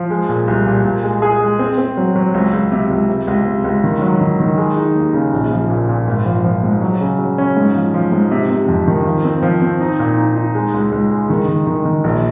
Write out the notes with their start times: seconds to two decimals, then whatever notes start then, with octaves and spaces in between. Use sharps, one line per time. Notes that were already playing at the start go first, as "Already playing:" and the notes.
Already playing: F3
0.10 G#3
0.29 A#2
0.48 C2
0.66 A#2
0.85 A#2
1.04 G#3
1.22 G#4
1.41 G#3
1.59 C4
1.78 C4
1.97 F#3
2.16 F#3
2.34 C#2
2.53 C#2
2.72 C3
2.90 C#2
3.09 C3
3.27 C#2
3.46 C3
3.64 C#2
3.84 D#3
4.02 F#3
4.21 D#3
4.40 D#3
4.58 G#3
4.76 D#4
4.96 D#2
5.14 C#3
5.33 A#1
5.51 F3
5.70 A#2
5.89 A#2
6.07 G#1
6.26 F3
6.44 F3
6.63 G#2
6.82 F#3
7.00 C#3
7.19 F#3
7.38 C#4
7.57 G#2
7.75 F3
7.94 F3
8.12 G#2
8.31 C3
8.50 C3
8.68 F2
8.88 D#3
9.06 F3
9.24 C4
9.43 F3
9.62 C4
9.80 D#4
9.99 A#2
10.18 D#4
10.36 D#4
10.55 G#3
10.74 C#2
10.92 C#2
11.11 G#3
11.30 D#3
11.48 D#3
11.67 D#3
11.85 D#3
12.04 A#1